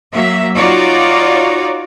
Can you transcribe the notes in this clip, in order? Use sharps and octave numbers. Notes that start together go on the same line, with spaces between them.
F#3 A#3 E5
D#4 F4 F#4 C#5 D5